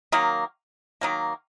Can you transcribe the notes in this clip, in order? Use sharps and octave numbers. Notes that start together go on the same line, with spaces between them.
D#3 F#3 A#3
D#3 F#3 A#3